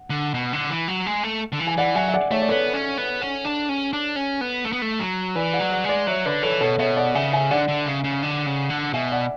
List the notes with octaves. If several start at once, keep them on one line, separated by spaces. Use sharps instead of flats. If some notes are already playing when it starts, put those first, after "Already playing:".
Already playing: F#5
D3
B2
D3
E3
F#3
G#3
A3
D3
E3
G#5
E3 D5 F#5
F#3 E5 G#5
E5
D5 F#5
A3 C#5 E5
D5
B3 A4 C#5
C#4
B3
C#4
D4
C#4
D4
C#4
B3
A3
B3
A3
F#3
E3 B4 D5
D5 F#5
F#3
D5 F#5
G#3 D5 F#5
F#3 C#5 E5
D3 B4 D5
E3 A4 C#5
B2 A4 C#5
B2 C#5 E5
D5 F#5
C#3 E5 G#5
E5 G#5
D3 D5 F#5
D3
C#3
C#3
D3
C#3
D3
B2 E5 G#5
D5 F#5